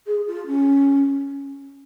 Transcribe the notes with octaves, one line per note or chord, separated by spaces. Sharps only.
G#4
F4
C#4